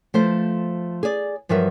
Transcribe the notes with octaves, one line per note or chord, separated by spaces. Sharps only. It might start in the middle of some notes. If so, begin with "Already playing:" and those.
F3 A3 C5
G#4 D5
G2 F3 F#3 A#4 E5